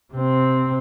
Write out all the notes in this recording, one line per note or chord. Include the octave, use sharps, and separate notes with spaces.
C3 C4